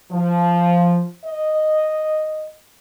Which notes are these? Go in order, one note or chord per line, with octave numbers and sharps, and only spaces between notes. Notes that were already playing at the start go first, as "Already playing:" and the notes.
F3
D#5